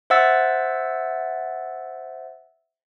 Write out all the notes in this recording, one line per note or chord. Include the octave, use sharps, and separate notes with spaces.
C5 E5 F#5 E6 A6